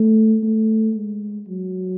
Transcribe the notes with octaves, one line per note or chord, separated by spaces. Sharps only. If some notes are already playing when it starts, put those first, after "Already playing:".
Already playing: A3
A3
G#3
F#3